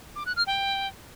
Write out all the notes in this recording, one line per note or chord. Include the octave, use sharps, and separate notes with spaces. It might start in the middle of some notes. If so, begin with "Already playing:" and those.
D6
F#6
F6
G5